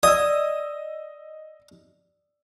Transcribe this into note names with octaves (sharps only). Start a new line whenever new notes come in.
D5 D#5 D#6 E6